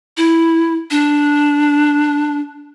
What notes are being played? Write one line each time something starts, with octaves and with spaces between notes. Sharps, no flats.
E4
D4